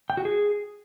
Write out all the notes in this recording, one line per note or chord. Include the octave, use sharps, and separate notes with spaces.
G5
F#4
G#4